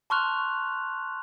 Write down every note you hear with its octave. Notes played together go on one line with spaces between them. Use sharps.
A5 C6 C#6 F6 F#6 F7